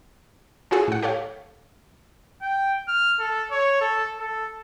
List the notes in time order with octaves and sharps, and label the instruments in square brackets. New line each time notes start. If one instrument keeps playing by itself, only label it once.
[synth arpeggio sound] C#4 F4 F#4 G#4 A4
A2 F#5
G4 A4 C#5 F5
[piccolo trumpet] G5
F6
A4
C#5
A4
A4